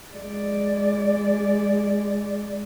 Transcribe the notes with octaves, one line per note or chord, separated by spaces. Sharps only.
G#3 D5